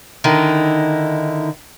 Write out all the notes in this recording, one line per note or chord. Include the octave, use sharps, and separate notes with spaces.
D3 D#3 D#4 E4